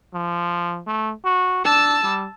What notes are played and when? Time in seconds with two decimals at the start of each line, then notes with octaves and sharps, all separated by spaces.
0.13 F3
0.86 A3
1.24 F#4
1.65 D4 A5 E6
2.03 G3